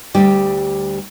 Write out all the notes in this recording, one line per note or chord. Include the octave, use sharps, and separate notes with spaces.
D2 G3 G4